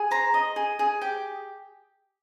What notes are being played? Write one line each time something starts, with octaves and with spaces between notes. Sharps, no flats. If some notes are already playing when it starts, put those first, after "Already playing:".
Already playing: G#4
C5 A#5
D#5
G#4
G#4
G4 G5